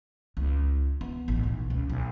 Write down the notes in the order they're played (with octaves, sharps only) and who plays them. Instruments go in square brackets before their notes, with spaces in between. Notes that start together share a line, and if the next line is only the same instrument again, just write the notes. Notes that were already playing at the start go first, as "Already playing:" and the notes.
[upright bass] C#2
B3
A1
B1
C#2
B1